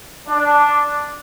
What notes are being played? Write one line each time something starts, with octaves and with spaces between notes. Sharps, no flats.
D4